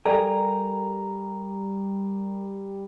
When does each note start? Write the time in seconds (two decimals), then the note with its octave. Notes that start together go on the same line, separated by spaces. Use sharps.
0.05 G3 A4 A#4 D5 G5 G#5 A#5